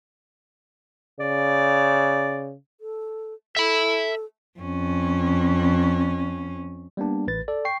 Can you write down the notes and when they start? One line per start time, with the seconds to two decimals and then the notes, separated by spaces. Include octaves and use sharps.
1.20 C#3 D5
2.81 A4
3.57 A4 E5 B5
4.59 F2 C#4
6.97 G3 A#3 B3 D4
7.27 A1 B4 A6
7.48 A4 D5
7.65 G5 C#6 C7